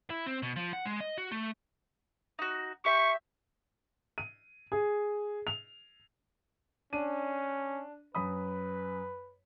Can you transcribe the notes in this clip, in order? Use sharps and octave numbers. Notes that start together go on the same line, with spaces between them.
E4
C4
B2
F3
F#5
G#3
D#5
F#4
A3
D#4 F#4
G4 E5 C#6
D#7
G#4
F7
C#4 D4 D#7
F#2 B4 B5 D#6